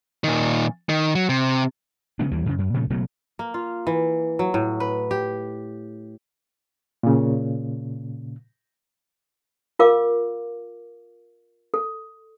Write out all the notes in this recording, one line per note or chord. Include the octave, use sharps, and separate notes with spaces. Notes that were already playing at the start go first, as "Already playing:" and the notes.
A#2 D#3
D#3
F#3
C3
C#3 G#3 B3 D4
D#2 E3 G3
F#2 C#3
F#2
A#2 C#3 F3 A3
F#1 B2 F#3 A3
A#3
F4
E3
F#3
A2
B4
G4
A#2 C#3
F4 A#4 F5 D6
A4